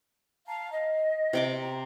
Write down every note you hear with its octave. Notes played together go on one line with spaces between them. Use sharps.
F5 A5 A#5
D#5
C3 G5 D6
A#5